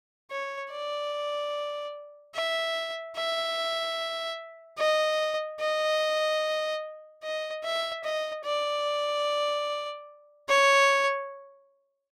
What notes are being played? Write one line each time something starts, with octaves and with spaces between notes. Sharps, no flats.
C#5
D5
E5
E5
D#5
D#5
D#5
E5
D#5
D5
C#5